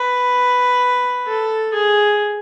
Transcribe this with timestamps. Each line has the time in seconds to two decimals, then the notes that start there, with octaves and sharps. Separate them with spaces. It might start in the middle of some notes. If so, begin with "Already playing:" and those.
Already playing: B4
1.27 A4
1.73 G#4